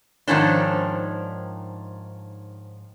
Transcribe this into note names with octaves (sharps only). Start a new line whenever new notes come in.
G#2 D#3 F3 C#4 D4